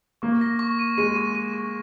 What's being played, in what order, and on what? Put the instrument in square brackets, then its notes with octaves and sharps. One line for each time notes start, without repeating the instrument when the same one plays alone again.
[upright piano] A#3 [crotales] C#6
[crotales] A#6
C#6
D#7
[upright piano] G#3 [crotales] D#7
[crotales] C#6
D#7
C#6